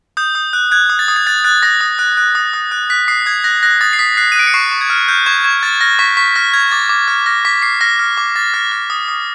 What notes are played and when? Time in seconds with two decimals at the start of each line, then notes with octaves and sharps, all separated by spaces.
0.17 D#6 G6
0.35 D#6
0.53 F#6
0.71 F#6 G#6
0.90 D#6
0.99 A6
1.08 D#6
1.16 G#6
1.27 F#6 A6
1.44 F#6 A6
1.62 D#6 A#6
1.81 D#6
1.99 F#6
2.17 F#6
2.35 D#6
2.54 D#6
2.71 F#6
2.90 F#6 B6
3.08 D#6 C7
3.26 D#6 G#6
3.44 F#6 A#6
3.63 F#6 A#6
3.81 D#6 A6
3.93 C7
3.99 D#6 B6
4.17 F#6 C7
4.32 D#7
4.35 F#6 D7
4.47 C#7
4.54 C#6 C7
4.71 C#6
4.81 G#6
4.90 F6
5.08 F6 G6
5.26 C#6 G#6
5.44 C#6 G#6
5.63 F6 A6
5.81 F6 A#6
5.99 C#6 B6
6.17 C#6 B6
6.35 F6 A#6
6.53 F6 G#6
6.71 D6 A6
6.89 D6
7.08 F6
7.26 F6 A#6
7.45 D6 B6
7.62 D6 C7
7.81 F6 A#6
7.99 F6
8.17 D6
8.36 D6 A6
8.54 F6
8.72 F6
8.90 D#6
9.08 D#6